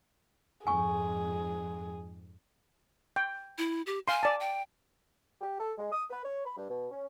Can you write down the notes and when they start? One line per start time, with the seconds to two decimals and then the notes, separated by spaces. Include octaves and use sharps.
0.67 F2 G#2 G#4 G#5 C#6
3.16 G5
3.58 E4
3.87 G4
4.08 F5 G#5 C6
4.23 D5 A5
4.40 G5
5.41 G4
5.60 A4
5.78 G#3
5.92 D#6
6.09 B4
6.25 C#5
6.45 B5
6.57 G2
6.69 B2
6.91 C#4